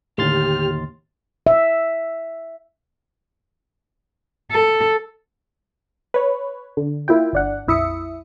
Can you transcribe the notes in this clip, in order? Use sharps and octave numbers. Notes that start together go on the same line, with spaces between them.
D#2 A2 D3 G4 C6 F6 A6
E5
A4
B4 C#5
D3
A#3 E4 F4 G5
G1 D4 F#5
A#1 F2 E4 E5 D#6 C#7